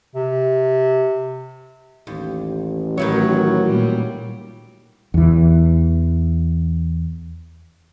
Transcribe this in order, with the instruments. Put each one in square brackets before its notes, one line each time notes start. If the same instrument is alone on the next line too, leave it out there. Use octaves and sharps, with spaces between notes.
[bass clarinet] C3
[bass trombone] A1 [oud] D#2
[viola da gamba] A2 [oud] D#3 E4 C#5 [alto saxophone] F#3
[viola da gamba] A#2 G3
[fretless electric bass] E2 E3